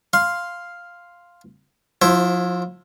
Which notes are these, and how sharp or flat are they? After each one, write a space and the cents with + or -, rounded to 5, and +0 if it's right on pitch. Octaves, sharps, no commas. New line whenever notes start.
F5 +0 C6 +0
F3 +35 E4 +10 C5 +5